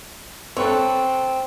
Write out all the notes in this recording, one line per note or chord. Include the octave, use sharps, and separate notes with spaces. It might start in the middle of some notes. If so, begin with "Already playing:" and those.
C4 A4 B4 C#5